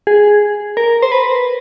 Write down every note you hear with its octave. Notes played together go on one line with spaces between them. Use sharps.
G#4
A#4
C5
B4